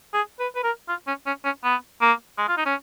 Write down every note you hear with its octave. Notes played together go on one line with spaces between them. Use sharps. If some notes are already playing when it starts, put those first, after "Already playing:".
G#4
B4
B4
A#4
F4
C#4
C#4
C#4
B3
A#3
G#3
F4
D#4
C#4